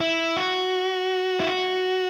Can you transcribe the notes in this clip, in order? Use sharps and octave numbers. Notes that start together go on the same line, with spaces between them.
E4
F#4
E4
F#4